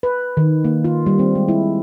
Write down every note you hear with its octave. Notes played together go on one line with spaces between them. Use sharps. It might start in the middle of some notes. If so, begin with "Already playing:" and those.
B4
D#3
A#3
F4
G3
C4
G#3
E4